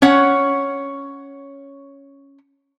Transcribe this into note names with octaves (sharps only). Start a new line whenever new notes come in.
C#4 C#5 F#5